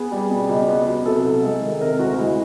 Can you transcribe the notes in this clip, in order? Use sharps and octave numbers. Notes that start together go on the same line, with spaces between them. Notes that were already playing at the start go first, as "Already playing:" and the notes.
Already playing: B3 G#4
G3
B2
C#2
B3
F#3
C3 A4
C2
G#3
D#3
C3 A#4
D2 F#4
G#3 E4